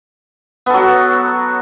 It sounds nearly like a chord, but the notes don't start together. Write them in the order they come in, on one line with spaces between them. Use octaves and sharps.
B3 A4 F#3 F#4